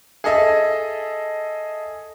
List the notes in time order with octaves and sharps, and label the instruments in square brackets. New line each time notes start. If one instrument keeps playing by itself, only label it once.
[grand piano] G#4 A4 D#5 E5